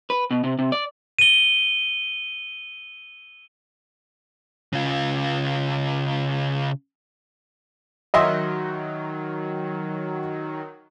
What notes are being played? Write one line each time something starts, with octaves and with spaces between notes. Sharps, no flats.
B4
B2
C3
C3
D5
D#7 G7
C#3 F4
D#3 F#3 D#5 E5 C6